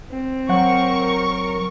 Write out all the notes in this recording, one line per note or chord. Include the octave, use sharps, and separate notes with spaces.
C4
F#3 A#4 F#5 C#6